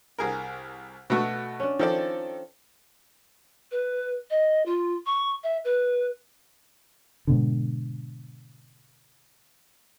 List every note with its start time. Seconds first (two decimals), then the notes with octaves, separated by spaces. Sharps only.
0.19 C2 G#4 A#4
1.10 B2 A3 F#4 E5
1.60 C#4 D4
1.79 D#3 F3 A4 D5
3.71 B4
4.30 D#5
4.66 F4
5.06 C#6
5.43 E5
5.65 B4
7.27 G#2 B2 D3